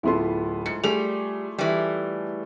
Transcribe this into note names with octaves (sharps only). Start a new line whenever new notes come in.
D1 B3 E4 F4 A4 C6
G#2 C#7
G3 A3 G#4 F7
E3 G3